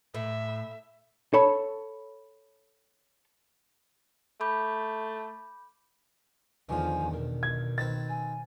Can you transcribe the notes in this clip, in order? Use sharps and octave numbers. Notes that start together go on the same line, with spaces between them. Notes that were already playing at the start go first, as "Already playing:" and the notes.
A2 E5
A4 C#5 A5 B5
A3 B5 D6 G6
E2 D3 D#3 F3 G#5
B2 A#4
G#6
D#3 C4 B4 A6
G#5